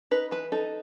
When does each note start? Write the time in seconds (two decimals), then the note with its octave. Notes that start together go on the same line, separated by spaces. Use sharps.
0.11 D#4 B4
0.31 E3 B4
0.52 D#4 A4